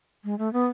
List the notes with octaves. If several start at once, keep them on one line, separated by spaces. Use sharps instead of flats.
G#3
A3
B3